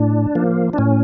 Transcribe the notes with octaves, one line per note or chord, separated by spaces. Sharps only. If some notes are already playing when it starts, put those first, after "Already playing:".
Already playing: A2 D4
F3 A#3
D4
A2 C#4